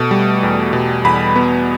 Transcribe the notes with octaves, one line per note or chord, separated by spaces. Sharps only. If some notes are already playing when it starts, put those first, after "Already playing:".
Already playing: B2 A3
G3
E2
B2
E2 B5
B3